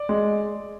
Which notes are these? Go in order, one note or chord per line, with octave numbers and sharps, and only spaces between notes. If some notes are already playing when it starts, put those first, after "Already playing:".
Already playing: D5
G#3